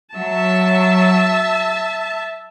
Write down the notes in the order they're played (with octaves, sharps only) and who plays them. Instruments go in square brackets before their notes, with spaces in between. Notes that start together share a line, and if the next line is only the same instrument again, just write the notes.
[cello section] F#3 [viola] E5 A5